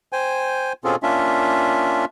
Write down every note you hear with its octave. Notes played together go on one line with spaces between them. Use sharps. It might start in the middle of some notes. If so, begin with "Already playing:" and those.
C5 G5 G#5
B2 C4 C#4 F4 G#4 A4
A#3 C#4 D4 F4 E5